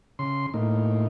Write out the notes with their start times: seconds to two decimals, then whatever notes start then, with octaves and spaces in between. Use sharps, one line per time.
0.19 C#3 C6
0.54 A2 A#3 D#4